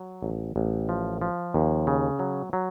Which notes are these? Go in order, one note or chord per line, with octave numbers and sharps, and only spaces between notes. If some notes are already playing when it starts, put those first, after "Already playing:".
Already playing: F#3
A1
A1
F3
F3
D#2
C#3
F#3
F#3